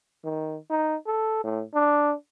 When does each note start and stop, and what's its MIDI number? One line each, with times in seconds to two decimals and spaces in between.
0.24 0.57 51
0.70 0.96 63
1.06 1.42 69
1.44 1.63 45
1.74 2.14 62